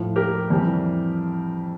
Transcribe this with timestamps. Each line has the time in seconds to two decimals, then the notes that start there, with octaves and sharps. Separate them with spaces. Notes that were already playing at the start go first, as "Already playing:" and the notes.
Already playing: A2 F3
0.16 G4 A#4
0.50 F2 E3 G3